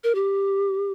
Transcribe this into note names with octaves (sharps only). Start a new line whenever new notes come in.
A#4
G4